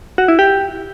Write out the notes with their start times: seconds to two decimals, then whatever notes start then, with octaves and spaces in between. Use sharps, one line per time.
0.18 F#4
0.28 E4
0.39 G4